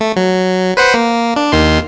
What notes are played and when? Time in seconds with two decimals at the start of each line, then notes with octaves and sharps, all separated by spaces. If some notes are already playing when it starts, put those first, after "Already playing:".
0.01 A3
0.16 F#3
0.77 B4 C5 F#5
0.94 A#3
1.36 D4
1.52 D#2 D#3 C6